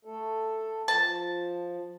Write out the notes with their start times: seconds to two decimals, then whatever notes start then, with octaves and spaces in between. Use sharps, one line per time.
0.05 A3 A4
0.88 F3 A5